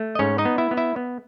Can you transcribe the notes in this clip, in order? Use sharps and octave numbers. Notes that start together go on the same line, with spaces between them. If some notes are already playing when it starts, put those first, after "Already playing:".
Already playing: A3
D#5
G#2 C#4 C#5
D#4 D#5
B3
E4 E5
B3
E4 E5
B3